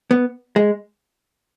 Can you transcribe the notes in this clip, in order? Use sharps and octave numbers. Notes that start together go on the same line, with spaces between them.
B3
G#3